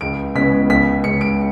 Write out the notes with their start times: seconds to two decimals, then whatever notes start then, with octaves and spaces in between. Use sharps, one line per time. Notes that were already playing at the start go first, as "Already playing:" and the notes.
0.01 C#2 D7
0.35 C#3 G#3 B3 B6
0.70 C#2 B6
1.04 C#3 G#3 C#7
1.21 D7